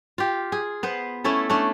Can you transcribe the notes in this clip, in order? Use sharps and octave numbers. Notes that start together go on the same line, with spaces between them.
F4 G4
G#4
B3 B4 C5
A3 C#4 E4 A4
A3 C#4 D4